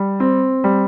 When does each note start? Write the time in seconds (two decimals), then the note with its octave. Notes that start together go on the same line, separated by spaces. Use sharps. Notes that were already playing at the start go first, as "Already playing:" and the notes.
Already playing: G3
0.20 C4
0.64 G3